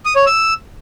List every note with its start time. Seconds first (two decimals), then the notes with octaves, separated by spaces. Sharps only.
0.05 D#6
0.16 C#5
0.26 E6